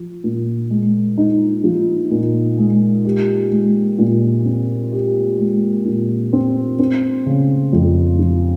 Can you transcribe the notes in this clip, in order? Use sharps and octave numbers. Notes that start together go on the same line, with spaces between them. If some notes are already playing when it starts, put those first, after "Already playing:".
Already playing: F3
A#2
G#3
D#4
F3
A#2
G#3
G4
G#3
A#2
C4
G4
G#3
A#2
C4
C4
C#3
F2
F3